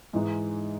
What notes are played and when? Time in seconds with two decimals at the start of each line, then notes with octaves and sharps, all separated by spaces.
0.13 G#2 E3 G#3 D#4